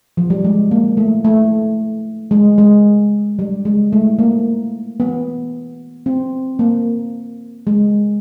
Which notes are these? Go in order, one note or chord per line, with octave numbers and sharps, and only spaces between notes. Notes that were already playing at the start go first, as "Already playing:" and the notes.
F3
G3
G#3
A#3
A3
A3
G#3
G#3
G3
G#3
A3
A#3
B3
C4
A#3
G#3